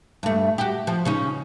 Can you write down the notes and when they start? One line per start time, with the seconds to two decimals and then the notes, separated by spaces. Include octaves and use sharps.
0.23 G2 A3
0.58 F#4 G4
0.87 F3
1.05 C#3 C#4 D#4